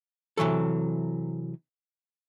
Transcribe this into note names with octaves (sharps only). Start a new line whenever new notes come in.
C3 E3 F#3 A4